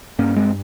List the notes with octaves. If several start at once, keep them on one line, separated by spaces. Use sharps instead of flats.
G2 A#3 C#4
G#3 C4